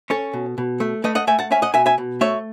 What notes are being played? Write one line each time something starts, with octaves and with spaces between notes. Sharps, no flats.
C#4 A4 C#5
B2
B2
A3
A3 B4 D#5
D#5 F#5
A3 E5 G#5
F#5 A5
C#4 E5 G#5
D#5 F#5
B2 E5 G#5
E5 G#5
B2
A3 C#5 E5